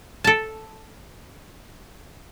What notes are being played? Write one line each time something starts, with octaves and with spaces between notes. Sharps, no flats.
A4 A5